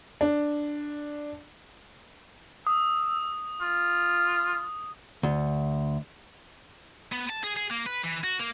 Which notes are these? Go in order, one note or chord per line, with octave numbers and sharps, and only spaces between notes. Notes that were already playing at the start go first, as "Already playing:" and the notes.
D4
D#6 E6
F4
D2
B3
A5
G#4
G#4
A#3
B4
E3
F#4
A#3